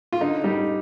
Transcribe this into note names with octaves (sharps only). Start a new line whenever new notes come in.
F4
D3 D#4
G3 D#4